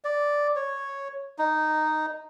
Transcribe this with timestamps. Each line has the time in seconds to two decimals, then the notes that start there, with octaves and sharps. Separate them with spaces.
0.04 D5
0.56 C#5
1.39 D#4